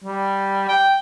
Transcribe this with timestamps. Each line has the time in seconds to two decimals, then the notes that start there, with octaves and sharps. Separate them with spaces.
0.04 G3
0.69 G5